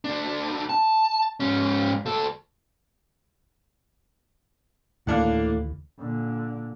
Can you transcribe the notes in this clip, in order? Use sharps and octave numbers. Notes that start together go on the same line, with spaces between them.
D2 D4
A5
G#2 C#4
D2 A4
D2 A2 D#3 E3 A#3 D4 F#5
A#2 D3